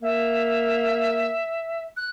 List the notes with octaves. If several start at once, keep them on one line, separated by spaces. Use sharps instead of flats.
A#3 E5
F#6